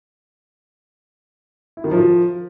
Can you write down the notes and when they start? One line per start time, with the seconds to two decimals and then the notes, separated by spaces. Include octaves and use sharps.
1.77 E4
1.84 D#3
1.91 F3